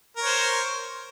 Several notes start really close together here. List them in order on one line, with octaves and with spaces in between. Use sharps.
A#4 C#5 C5